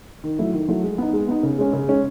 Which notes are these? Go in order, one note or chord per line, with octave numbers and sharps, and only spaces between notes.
D#3
F#3 A3 E4
D#3
F#3 A3 E4
G#3
B3 D#4
G#3
B3 D#4
C#3
G#3 C#4
C#3
G#3 C#4